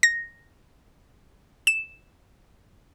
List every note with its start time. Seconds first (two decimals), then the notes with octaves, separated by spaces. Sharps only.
0.03 A#6
1.67 E7